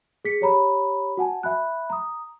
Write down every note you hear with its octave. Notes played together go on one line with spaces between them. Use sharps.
G#4 B6 C#7
G4 C#5 A#5 B5
F#4 F#5 G#5 A5
E5 B5 F#6
A#5 D#6